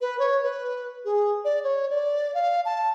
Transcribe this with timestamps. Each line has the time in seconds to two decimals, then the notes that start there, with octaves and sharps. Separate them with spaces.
0.01 B4
0.19 C#5
0.43 B4
1.05 G#4
1.45 D5
1.64 C#5
1.90 D5
2.34 F5
2.65 A5